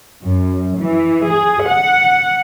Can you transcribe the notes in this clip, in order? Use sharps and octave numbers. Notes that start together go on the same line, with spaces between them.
F#2
E3
G#4
F#5